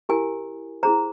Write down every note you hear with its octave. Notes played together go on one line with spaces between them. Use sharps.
E4 G4 A#4 G#5
E4 G#4 C5 A#5